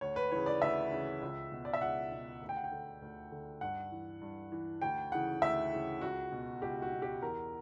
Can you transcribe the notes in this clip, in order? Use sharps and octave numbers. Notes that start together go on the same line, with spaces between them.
D2 C#5
B4
C#3 E3 C#5
D5
D2 E5
C#3 E3
C#2
B2
D5
E5
C#2 F#5
B2
D2
G5
F#5
G5
D3
D2
D3
G2 F#5
E3
G2
E3
D2 G5
C#3 E3 F#5
D2 E5
C#3 E3
C#2 F#4
B2
C#2 G4
F#4
B2
G4
E2 A#4